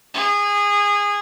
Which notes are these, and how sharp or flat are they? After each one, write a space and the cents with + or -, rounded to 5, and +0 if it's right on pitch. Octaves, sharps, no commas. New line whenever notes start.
G#4 -20